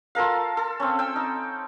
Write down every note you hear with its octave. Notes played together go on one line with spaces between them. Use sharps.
F4 A4 A#4 F5
A4
C4 C#4
G5 E6
D#4